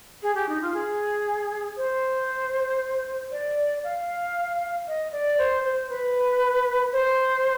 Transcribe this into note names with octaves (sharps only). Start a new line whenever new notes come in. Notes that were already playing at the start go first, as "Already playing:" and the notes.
G#4
G4
D#4
F4
G#4
C5
D5
F5
D#5
D5
C5
C5
B4
C5